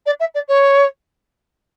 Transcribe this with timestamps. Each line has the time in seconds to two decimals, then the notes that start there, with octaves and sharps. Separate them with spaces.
0.05 D5
0.19 E5
0.34 D5
0.48 C#5